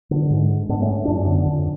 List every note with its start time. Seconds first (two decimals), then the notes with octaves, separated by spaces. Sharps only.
0.11 D3
0.31 G#2
0.69 G#2 B3 D4
0.82 A3 C#4
1.05 F#2 D4
1.15 C#4
1.25 D3 B3 D4
1.46 F2